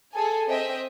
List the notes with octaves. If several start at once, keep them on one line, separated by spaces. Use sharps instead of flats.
G#4 A4 G#5
C4 D#5 E5 G5